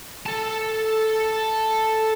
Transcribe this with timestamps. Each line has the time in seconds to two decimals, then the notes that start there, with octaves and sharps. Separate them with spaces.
0.26 A4 A5